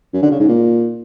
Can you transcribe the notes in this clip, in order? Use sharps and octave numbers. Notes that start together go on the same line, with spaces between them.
F#2
D3
C#3
G#2
A#2